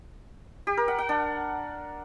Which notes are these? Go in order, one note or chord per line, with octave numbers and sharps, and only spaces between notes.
G4
A#4
F#5
F#5
D4